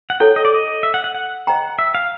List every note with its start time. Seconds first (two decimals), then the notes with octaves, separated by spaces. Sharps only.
0.10 F#5
0.20 E4 A4 C#5 G5
0.36 D#5
0.45 D5
0.54 D#5
0.83 E5
0.94 F#5
1.04 F#5
1.15 F#5
1.47 C5 D#5 G5 A#5
1.79 E5
1.95 F5